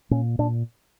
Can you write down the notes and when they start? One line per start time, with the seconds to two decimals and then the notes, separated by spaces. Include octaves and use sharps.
0.11 A#2 C#4
0.39 A#2 D4